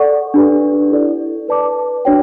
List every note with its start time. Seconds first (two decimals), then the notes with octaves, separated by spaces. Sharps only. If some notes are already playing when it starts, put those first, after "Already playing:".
Already playing: A4 D5 F#5 C#6
0.34 D4 G4 B4
0.91 E4 A4 D5
1.48 B4 D5 A5 D6
2.05 D4 F#4 C#5 G5